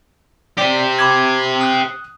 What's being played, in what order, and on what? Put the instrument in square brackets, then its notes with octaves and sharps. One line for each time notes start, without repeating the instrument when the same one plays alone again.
[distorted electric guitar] G4 C5 [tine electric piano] D5 B6
[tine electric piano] B5 D6 G#6
D#6 F#6